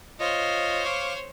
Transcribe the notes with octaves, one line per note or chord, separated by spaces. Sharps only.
F4 C5 C#5 D#5
F5 C#6 D6